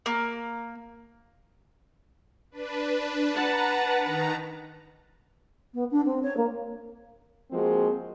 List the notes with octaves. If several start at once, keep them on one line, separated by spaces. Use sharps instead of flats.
A#3
D4 B4
B4 F#5 A5 A#5
D#3 A#5
B3
D4
C4
C#5
A#3
F3 G#3 A#3 C4 F#4 G#4